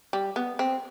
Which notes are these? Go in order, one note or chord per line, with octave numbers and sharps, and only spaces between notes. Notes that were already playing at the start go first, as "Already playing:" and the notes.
G3
B3
C4